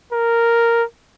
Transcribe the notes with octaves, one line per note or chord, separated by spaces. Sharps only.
A#4